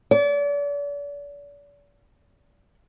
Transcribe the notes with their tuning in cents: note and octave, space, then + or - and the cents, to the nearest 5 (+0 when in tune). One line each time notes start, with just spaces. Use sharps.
D5 -40